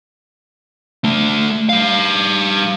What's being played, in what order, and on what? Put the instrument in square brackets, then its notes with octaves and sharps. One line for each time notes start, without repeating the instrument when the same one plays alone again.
[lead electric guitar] A3 D4
G3 F5